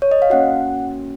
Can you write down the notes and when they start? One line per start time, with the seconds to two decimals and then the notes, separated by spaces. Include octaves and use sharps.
0.02 C#5
0.11 D#5
0.22 F5
0.30 A#3 C#4 F#4 F#5